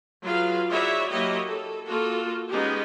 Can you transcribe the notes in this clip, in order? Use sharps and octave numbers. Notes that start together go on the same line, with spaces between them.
F#3 F4 G#4 B4 F5
E4 F#4 G#4 C#5 D5 E5
F#3 A#3 E4 G4 C#5 D#5
A4
A#3 F4 F#4 A4
G#3 B3 C#4 D#4 G4 G#4